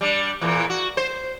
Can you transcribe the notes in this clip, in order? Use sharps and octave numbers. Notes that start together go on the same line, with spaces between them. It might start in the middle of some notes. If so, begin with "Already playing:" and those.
G3 D4
E2 A#2 E3
F#4
C5